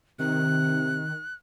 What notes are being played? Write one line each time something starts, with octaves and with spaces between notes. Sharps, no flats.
C3 D#3 F#6